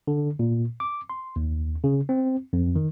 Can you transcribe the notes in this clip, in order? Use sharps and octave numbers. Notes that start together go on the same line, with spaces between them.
D3
A#2
D6
C6
D#2
C#3
C4
F2
D#3